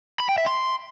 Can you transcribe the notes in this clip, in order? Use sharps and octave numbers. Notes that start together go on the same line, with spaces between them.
B5
G5
E5
C6